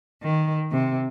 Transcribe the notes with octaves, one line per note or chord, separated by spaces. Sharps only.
D#3
C3